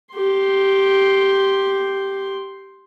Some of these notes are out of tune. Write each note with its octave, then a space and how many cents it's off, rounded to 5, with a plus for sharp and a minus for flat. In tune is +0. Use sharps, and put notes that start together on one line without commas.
G4 -5 C6 +5